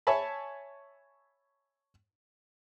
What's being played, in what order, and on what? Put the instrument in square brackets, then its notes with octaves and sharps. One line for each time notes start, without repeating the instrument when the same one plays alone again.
[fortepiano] C#5 E5 G#5 A5 B5